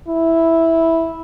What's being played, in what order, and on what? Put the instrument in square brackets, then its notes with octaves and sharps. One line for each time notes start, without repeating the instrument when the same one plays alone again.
[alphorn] E4